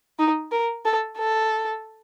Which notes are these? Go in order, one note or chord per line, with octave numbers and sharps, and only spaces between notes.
D#4
A#4
A4
A4